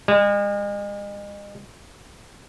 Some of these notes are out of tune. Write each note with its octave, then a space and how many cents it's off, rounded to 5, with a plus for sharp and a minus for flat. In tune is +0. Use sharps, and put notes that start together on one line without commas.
G#3 -40